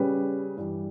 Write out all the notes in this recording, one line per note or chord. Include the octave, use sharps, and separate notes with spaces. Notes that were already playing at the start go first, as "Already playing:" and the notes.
Already playing: C#3 G3 C#4 G4 B4
G2 E3 G3